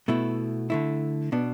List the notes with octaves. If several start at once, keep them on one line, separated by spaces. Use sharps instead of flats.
B2 A3 E4
D3 A3 E4
B2 B3 D4